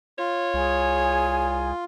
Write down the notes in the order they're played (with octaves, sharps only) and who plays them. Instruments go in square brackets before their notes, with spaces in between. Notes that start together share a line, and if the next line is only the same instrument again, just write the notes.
[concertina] F4 [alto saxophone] C#5
[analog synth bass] C2 [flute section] G#4 G#5